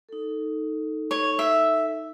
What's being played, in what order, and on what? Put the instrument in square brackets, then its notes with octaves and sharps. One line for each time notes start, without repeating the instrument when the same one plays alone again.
[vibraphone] D#4 A4
[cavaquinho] C#5
E5